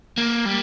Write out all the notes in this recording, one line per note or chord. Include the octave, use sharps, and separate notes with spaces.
A#3
G3